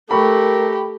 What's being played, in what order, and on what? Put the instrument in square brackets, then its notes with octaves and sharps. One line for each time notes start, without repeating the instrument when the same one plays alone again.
[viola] A3 [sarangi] G4 [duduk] A#4 [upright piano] B5 C#6